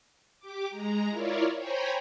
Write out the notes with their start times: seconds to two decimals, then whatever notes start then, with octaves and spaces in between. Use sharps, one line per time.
0.39 G4 D6
0.70 G#3 A#5
1.10 E4 F4 A#4 C#5 D5
1.57 C5 C#5 G5 G#5 A#5 B5